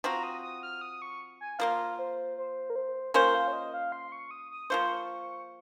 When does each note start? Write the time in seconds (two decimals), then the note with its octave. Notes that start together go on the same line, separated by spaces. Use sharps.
0.04 F3 C4 F#4 A#5
0.23 D#6
0.42 D#6
0.63 F6
0.81 D#6
1.02 C#6
1.41 G#5
1.59 F3 A#3 F4 F5
1.99 C5
2.38 C5
2.70 A#4
2.76 C5
3.14 A#3 C#4 F4 A#4 C5
3.35 F5
3.48 C#5
3.53 D#5
3.74 F5
3.92 C6
4.12 C#6
4.31 D#6
4.51 D#6
4.70 F3 A#3 F4 C5 C#6